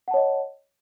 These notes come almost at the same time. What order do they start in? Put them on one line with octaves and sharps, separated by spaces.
F#5 A5 C#5 D#5